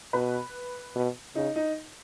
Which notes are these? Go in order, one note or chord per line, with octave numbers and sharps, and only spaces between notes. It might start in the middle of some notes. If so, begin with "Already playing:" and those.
B2 B4
B2
C#3 D#4
D#4